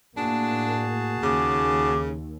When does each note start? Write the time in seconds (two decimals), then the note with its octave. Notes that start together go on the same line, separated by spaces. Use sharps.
0.17 A2 A#3 D4 F#4 G#4 A5
1.23 D#2 C#3 D6